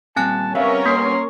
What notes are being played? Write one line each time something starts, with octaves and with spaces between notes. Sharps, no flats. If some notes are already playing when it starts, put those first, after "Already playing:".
A#2 G3 C4 G#5 A5 F#6
G3 B3 C#4 A#4 C#5 E5 F5
A#3 C6